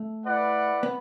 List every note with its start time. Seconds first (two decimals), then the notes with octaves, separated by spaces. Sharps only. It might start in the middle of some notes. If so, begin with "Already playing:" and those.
Already playing: A3
0.25 E4 B4 D5 F#5
0.83 B3